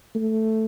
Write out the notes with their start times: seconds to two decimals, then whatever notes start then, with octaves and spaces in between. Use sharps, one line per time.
0.15 A3